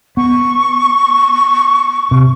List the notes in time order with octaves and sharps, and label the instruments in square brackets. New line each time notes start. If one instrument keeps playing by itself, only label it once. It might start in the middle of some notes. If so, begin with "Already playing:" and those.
[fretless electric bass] B3 [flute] C#6
[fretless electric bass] C3